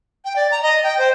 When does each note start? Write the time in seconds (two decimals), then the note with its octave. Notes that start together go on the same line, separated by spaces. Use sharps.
0.25 G5
0.36 D5
0.51 A#5
0.63 D#5
0.83 G5
0.98 C5